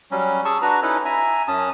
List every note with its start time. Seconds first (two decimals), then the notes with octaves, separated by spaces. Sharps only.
0.11 F#3 G3 C#4
0.45 G#4 A5 C#6 E6
0.62 D4 F#4 B4 A#5
0.82 C#4 D#4 E4 A4 B4
1.05 E5 G#5 A#5
1.48 F#2 C#4 A5 D#6